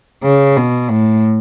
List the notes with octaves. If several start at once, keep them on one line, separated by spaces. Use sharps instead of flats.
C#3
B2
A2